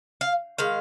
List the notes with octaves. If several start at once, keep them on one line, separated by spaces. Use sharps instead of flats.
F5
D#3 G#3 F5